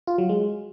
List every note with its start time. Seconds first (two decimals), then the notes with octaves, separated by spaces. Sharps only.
0.07 F4
0.18 F#3
0.29 G#3